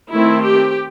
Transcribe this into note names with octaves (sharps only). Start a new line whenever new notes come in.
D#3 A3 C4 E4
G4